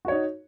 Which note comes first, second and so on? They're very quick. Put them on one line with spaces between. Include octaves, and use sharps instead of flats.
F#4 C#5 D#4